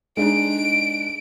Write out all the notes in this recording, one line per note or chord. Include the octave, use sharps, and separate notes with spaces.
G#3 D4 D#4 D7